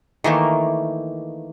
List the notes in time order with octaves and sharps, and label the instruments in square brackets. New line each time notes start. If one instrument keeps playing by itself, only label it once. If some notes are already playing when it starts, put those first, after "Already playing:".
[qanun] D#3 E3 A3 A#3